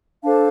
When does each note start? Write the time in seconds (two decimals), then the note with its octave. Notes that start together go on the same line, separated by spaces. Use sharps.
0.23 D4 A4 C5 F5 A5